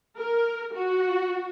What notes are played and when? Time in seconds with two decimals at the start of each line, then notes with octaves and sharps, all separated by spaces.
0.17 A#4
0.74 F#4